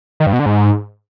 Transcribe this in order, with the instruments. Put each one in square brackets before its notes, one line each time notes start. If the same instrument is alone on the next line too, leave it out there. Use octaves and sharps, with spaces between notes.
[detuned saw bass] D#3
G2
B2
D3
G#2